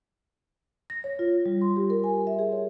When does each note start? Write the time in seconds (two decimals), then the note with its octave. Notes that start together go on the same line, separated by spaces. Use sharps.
0.90 A#6
1.04 C#5
1.19 F4
1.46 G3
1.61 C6
1.76 G4
1.90 A#4
2.04 G#5
2.27 E5
2.39 G#4
2.52 C#5